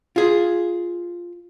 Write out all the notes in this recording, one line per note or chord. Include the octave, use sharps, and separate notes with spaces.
F4 G#4